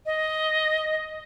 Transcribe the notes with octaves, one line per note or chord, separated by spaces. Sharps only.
D#5